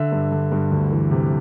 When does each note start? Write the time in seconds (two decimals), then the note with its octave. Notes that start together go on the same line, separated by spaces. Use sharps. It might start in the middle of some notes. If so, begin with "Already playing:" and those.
Already playing: D3 E5
0.12 G2
0.32 D3
0.52 G2
0.71 D2
0.91 E3
1.11 C3